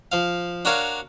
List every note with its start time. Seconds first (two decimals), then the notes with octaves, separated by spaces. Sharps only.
0.12 F3 F5
0.65 D4 F#4 A#4 C#5 F5